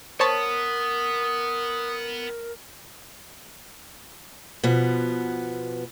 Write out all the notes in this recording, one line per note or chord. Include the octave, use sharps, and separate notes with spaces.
B3 A#4 C5 C#5 A5 D#6
B2 F3 B3